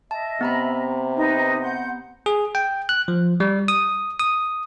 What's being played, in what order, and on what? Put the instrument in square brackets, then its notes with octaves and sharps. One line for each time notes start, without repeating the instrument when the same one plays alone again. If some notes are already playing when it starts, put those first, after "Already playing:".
[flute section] D#5 E5 [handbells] A5
[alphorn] C3 [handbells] B3 A#5 B5
[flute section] D#4 B4
F#5 C6 G6
[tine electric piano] G#4
G5
F#6
F3
G3
D#6
D#6